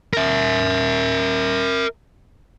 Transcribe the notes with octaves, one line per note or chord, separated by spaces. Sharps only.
A#4 E5